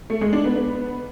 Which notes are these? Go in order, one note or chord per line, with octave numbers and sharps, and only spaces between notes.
A3
G#3
D4
B3
B3